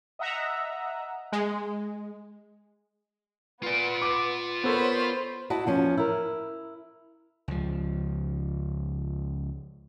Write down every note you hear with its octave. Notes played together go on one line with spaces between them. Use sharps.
D#5 E5 F#5 A#5
G#3
B3 F4 D5
D6
B3 A4 A#4 C5 C#5 B5
E4 F#4 D#5 A5
E2 F3 C#4
E4 A#4
C#2 F3